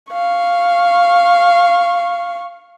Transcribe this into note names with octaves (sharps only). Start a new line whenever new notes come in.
F5 C#6